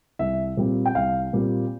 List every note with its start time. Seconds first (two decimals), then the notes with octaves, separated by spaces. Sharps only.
0.19 C2 E5
0.57 A#2 G3 C4
0.86 G5
0.95 C2 F5
1.33 A#2 G3 C4